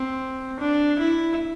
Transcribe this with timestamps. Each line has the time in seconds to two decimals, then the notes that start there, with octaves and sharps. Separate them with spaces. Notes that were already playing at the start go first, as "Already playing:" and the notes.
Already playing: C4
0.60 D4
0.99 E4